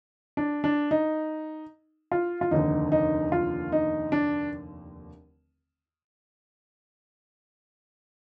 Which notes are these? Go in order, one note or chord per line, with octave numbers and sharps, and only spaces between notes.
D4
D4
D#4
F4
F4
F1 D#2 D3 D#4
D#4
F4
D#4
D4